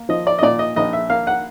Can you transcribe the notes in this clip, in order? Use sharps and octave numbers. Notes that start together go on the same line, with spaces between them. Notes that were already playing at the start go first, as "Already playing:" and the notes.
Already playing: A#3
F3 D#5
D5
D#5
A#2 D5
D#5
A#1 D#5
E5
A#3 F5
F#5